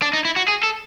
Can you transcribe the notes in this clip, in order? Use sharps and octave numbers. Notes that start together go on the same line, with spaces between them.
D4
D#4
E4
F#4
G#4
A4